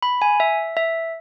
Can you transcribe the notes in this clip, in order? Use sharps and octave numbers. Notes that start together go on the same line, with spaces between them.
B5
G#5
E5
E5